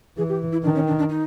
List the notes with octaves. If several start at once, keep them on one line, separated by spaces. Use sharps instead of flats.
E3 G#4
G4
E4
D#3 D4
C#4
D4
D4
D#4